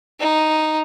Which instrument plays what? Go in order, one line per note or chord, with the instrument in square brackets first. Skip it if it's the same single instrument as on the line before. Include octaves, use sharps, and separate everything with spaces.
[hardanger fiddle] D#4